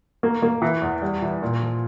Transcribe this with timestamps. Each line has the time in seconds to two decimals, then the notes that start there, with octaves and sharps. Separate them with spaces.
0.23 A#3
0.42 A#3
0.62 E3
0.82 E2
1.02 G3
1.22 E3
1.42 A#2
1.62 F3